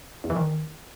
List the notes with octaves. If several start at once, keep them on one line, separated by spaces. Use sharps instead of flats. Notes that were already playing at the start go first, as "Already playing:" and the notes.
E2
E3
D#3